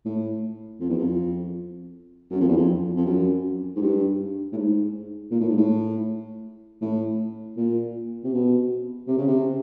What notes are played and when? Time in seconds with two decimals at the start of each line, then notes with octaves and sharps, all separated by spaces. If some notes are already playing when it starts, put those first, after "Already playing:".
0.05 A2
0.80 F2
0.89 E2
0.98 F2
2.30 F#2
2.40 F2
2.48 E2
2.56 F2
2.96 F2
3.05 F#2
3.76 G#2
3.82 G2
4.52 A2
4.57 G#2
5.31 A#2
5.40 A2
5.49 G#2
5.57 A2
6.82 A2
7.57 A#2
8.23 C3
8.33 B2
9.07 C3
9.17 C#3
9.27 C3